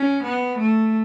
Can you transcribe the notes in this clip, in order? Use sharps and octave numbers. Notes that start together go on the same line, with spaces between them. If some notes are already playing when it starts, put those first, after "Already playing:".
Already playing: C#4
B3
A3